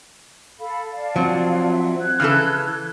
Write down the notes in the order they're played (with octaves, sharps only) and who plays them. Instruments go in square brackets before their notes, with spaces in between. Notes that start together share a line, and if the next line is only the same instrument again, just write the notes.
[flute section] A4 F5 B5
D5 F5 A5
[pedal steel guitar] F3 C4 [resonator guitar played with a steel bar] F#3
[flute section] E5
F#6 G#6
[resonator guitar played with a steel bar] C#3 E3 A4 [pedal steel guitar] F6